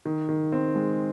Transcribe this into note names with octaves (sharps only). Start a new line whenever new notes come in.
D#3
D#3
C4
G#3